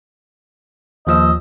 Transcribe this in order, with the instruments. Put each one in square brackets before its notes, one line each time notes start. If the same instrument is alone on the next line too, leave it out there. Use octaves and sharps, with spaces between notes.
[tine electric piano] D#2 F3 E6 [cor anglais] D#5